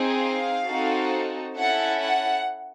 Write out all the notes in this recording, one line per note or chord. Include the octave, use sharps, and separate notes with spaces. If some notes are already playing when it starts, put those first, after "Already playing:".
Already playing: C4 D#4 G#4
F5
C4 D#4 F#4 A4
C#4 E4 A4 F#5
F#5